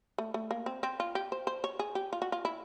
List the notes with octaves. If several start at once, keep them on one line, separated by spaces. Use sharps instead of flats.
A3
A3
A#3
C4
C4
F4
G4
C5
C5
C#5
G#4
G4
F4
F#4
F4
E4